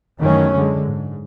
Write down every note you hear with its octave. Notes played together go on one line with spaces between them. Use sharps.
F#2 D#3 E3 F#3 A3 C#4
D3 G#3
G#2